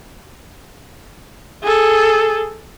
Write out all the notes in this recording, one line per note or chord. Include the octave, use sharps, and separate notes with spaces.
G#4 A4